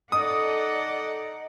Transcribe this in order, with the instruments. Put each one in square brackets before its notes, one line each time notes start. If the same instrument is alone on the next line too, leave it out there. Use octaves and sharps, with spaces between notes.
[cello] D#4 F#5 [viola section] A4 D5 [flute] D#5 [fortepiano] D#6